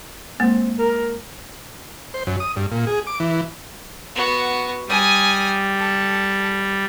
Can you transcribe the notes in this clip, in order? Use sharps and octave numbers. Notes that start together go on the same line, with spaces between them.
G#3 A#3 C4
A#4
C5
F#2
D#6
G2
A#2
G#4
D6
E3
B3 F#4
G3 G#5 D#6
A4